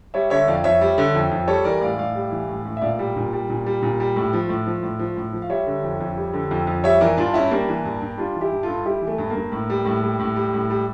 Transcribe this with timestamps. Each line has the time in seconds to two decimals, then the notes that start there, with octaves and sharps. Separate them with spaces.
0.14 G3 C#5 E5
0.30 D3 C#5 E5
0.48 F2 D5 F5
0.64 F2 C#5 E5
0.81 G3
0.98 D3
1.15 F2
1.31 F2
1.47 G3 A4 C#5
1.64 E3 A#4 D5
1.81 A2 D5 F5
1.98 A2 D5 F5
2.15 G3
2.31 E3
2.48 A2
2.65 A2
2.77 E5
2.82 A#2 D5 F5
2.99 G3
3.16 A#2
3.33 G3
3.50 A#2
3.66 G3
3.82 A#2
4.00 G3
4.16 A2
4.33 F3
4.49 A2
4.66 F3
4.83 A2
4.99 F3
5.16 A2
5.33 F3
5.42 F5
5.50 G3 C#5 E5
5.67 D3
5.84 F2
6.00 F2
6.17 G3
6.33 D3
6.51 F2
6.67 F2
6.84 G3 C#5 E5
7.01 E3 A#4 D5
7.17 G2 D4 F4
7.34 G2 C#4 E4
7.51 G3 A#3 D4
7.68 E3
7.85 G2
8.01 G2
8.18 G3 D4 F4
8.35 E3
8.41 E4 G4
8.52 G2
8.63 F4 A4
8.68 G2
8.85 G3 E4 G4
9.02 E3
9.08 A3
9.18 G2
9.30 A#3
9.35 G2
9.52 A2
9.70 G3
9.85 A2
10.03 G3
10.20 A2
10.36 G3
10.53 A2
10.70 G3